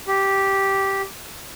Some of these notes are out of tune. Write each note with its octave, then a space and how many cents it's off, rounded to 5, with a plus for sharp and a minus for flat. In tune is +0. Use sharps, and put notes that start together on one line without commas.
G4 -5